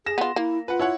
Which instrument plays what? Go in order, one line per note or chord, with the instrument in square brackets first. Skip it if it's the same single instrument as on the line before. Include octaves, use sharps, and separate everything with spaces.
[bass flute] G#4 [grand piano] A#6 E7
[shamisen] B3 F4
[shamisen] A#3 [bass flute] E4
[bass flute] F4 [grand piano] B4 F#5
[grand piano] E4 C#5 F#5